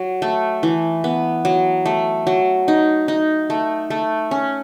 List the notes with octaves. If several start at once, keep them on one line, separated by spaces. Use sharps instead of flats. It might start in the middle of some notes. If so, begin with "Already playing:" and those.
Already playing: F#3
A3
E3
B3
F#3
A3
F#3
D#4
D#4
A3
A3
C#4